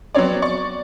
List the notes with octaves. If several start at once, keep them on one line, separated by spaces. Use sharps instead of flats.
F#3 B3 C4 C#5 D5
D5 C#6